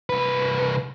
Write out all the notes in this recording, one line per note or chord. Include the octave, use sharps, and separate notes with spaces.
C2 B4